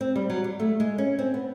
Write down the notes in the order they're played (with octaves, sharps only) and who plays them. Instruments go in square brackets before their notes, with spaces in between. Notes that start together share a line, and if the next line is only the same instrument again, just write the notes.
[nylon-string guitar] C4
G3
F#3
G3
A3
G#3
C#4
C4
B3